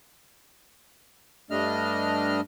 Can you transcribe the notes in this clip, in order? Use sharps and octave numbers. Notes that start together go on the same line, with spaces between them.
G2 G3 A3 D4 D#5 F6